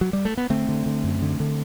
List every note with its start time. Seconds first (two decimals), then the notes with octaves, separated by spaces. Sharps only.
0.01 F#3
0.13 G3
0.25 A3
0.37 B3
0.50 D3 A3 C4
0.69 D3
0.86 D3
1.04 F#2
1.22 D3
1.40 D3